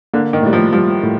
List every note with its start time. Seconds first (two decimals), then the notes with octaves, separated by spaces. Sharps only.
0.13 D3 A#3
0.33 D#3
0.43 A2 G3
0.53 F3
0.73 F3 G3
1.03 A2